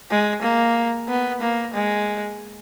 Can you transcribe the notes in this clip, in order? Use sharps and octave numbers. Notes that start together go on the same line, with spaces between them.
G#3
A#3
B3
A#3
G#3